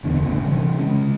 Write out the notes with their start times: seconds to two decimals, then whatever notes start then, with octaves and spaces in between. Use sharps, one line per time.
0.03 D1 E2 D3 B3
0.23 G1 A2 C#3
0.47 C3 E3 G3
0.80 C#3 G#3 C#4